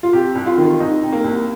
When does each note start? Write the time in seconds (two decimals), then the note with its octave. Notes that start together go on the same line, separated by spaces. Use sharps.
0.03 F4
0.13 C3 G4
0.35 C2
0.46 F4
0.58 D#3
0.80 C2 D#4
1.02 C3
1.12 A#3
1.24 C2